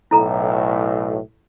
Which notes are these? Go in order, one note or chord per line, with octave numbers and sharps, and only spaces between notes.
B1 A2 E4 A4 A#5